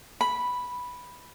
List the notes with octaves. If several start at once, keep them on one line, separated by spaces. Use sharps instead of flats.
B5